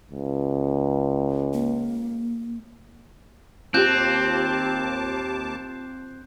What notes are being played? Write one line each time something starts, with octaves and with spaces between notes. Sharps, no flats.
C#2
A#3
D#2 C4 F4 G4 A5 D6 F#6 G6